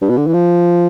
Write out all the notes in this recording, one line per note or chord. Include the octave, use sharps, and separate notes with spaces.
G2
B2
D3
E3
F3